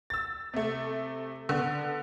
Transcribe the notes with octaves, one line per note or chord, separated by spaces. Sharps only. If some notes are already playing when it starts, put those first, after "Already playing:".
E6 A6
C3 A3
D3 B3